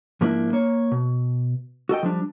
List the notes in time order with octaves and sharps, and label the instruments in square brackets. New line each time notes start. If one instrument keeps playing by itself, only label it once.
[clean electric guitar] G#2 F3 A#3 D4 E4
A#3 C#5
B2
F#4 A4 D#5 G5
F3 G3 D4